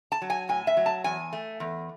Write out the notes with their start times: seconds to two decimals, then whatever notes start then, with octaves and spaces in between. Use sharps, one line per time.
0.12 A5
0.22 F#3
0.30 G#5
0.49 A2 G#5
0.67 E5
0.77 F#3
0.86 A5
1.04 E2 G#5
1.33 A3
1.60 E2